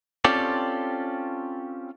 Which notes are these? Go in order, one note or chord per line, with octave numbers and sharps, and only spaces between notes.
C4 C#4 F4 G4 A4 D5